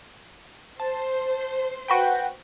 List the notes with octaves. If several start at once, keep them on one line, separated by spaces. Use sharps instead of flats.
C5 A5
F#4 B4 G5